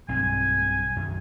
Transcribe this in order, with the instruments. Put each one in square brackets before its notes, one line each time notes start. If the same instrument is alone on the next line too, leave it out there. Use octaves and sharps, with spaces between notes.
[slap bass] B1 G2 C4 [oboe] G#5
[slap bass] F#2 D#3